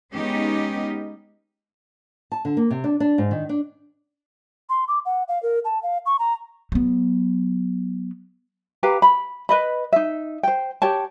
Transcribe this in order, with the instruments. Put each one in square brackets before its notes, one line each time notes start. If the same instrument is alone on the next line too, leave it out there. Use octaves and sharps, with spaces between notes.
[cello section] G#3 B3 C#4 D#4 G4
[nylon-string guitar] A5
D3
A#3
C3
D4
D4
G#2
D#3
D4
[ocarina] C6
D6
F#5
F5
A#4
A5
F5
C#6
A#5
[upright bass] F#3 B3
[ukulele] G4 B4 F5 A#5
B5
B4 D#5 B5
D#4 E5
C5 G5
G4 C#5 G5 A5